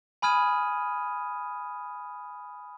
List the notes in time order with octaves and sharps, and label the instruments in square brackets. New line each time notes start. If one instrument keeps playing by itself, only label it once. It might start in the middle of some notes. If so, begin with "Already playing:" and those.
[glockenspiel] G#5 B5 D#6 F6 G#6 D#7